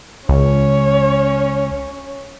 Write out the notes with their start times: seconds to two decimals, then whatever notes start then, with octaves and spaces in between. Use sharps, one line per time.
0.29 C#2 C#4 C#5